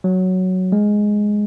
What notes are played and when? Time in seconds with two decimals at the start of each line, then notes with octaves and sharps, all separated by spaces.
0.04 F#3
0.72 G#3